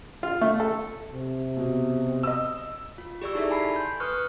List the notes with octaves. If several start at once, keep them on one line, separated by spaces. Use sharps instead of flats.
F4
A3
A4
C3
B2
D#5 E6
F4
G4 G#4 D5 C#6 E6
D#4 E4 G4 A4 D5 E5
G#5 A5 B5 C7
C6 G6
B4 C#6 D#6 F6 F#6